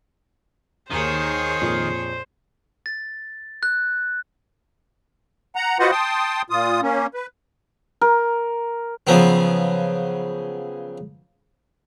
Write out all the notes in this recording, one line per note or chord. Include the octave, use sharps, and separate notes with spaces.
D#2 D#3 G#4 C5 C#5 A#5 D#7
F2 A#2
A6
F#6
F#5 A#5
F4 F#4 B4 C5 D#5 F#5
G5 A5 C6 D#6
A#2 F4 D#6
A#3 C#4
B4
A#4
C#3 F3 F#3 B3 C4